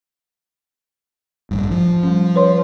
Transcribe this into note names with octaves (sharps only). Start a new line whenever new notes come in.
A1 G2
F3
G3 C#4
B4 C#5 C6